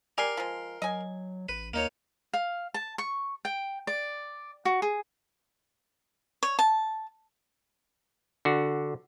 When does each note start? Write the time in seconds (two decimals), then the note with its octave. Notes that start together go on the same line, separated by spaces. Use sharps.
0.18 G4 A#4 D5 G#5 C6
0.37 F3 G#3
0.82 F#3 D#5 G#5
1.49 A1 B4
1.74 D#2 A#3 D#4 C#5
2.33 F5
2.74 A5
2.98 C#6
3.45 G5
3.87 D5
4.65 F#4
4.82 G#4
6.43 C#5
6.59 A5
8.45 D3 F#4